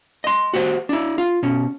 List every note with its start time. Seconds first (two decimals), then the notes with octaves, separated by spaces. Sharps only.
0.24 D#5 C6
0.54 F#4 G4 C5 F#5
0.89 D4 E4
1.18 F4
1.43 B2 C#4